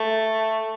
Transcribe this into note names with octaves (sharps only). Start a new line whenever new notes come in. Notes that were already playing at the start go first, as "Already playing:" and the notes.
Already playing: A3